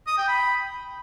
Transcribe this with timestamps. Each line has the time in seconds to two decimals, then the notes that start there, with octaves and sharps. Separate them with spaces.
0.07 D#6
0.17 G5
0.28 B5